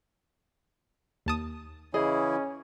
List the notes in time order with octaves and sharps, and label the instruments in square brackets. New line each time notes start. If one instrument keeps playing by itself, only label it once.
[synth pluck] D#2 A5 D#6
[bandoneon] C#3 E3 E4 [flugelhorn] C#4 [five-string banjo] G#4 D#5